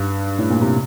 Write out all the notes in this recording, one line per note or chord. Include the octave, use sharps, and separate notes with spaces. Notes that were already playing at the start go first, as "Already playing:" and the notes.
Already playing: G2
A2
A#2
C3